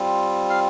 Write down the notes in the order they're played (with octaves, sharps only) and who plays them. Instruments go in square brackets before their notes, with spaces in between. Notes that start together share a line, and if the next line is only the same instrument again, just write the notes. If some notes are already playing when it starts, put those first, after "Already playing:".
Already playing: [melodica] G3 C4 F4
F5